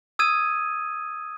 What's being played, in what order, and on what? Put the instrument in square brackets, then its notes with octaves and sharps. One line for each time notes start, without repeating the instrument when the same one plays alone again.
[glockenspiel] D#6 E6 G#6 D#7